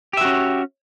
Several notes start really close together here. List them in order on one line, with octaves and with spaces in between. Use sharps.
G4 E5 F#4 C#4